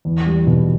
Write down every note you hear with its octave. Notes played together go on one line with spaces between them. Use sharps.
E2
G3
B2